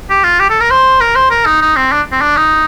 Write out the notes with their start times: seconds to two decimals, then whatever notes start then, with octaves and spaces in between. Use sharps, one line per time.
0.10 G4
0.24 F4
0.40 G4
0.50 A4
0.60 A#4
0.70 C5
1.00 A#4
1.15 C5
1.31 A#4
1.45 D#4
1.61 D#4
1.76 C4
1.92 D4
2.12 C4
2.21 D4
2.37 D#4